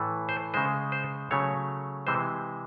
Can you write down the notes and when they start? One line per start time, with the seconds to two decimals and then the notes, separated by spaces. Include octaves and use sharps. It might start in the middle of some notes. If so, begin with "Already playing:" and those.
Already playing: A2 E3 A3
0.29 C5
0.54 C#3 G#3 C5
0.92 C5
1.31 C#3 F#3 A3 C#5
2.07 C3 E3 G#3 C5